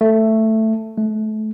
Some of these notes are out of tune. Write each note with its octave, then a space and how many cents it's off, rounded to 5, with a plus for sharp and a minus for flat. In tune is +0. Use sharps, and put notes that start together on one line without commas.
A3 +5
A3 -30